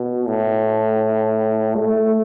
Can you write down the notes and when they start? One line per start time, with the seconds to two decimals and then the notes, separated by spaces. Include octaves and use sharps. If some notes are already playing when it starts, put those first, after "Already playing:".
Already playing: B2
0.27 A2
1.77 A3